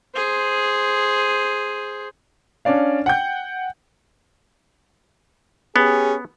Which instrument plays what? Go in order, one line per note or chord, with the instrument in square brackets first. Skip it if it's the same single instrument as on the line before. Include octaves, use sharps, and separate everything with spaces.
[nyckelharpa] G#4 C5
[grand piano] C#4 D4 D5 F5
F#5 G5 G6
[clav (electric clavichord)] B3 [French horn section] C#4 G4 G#4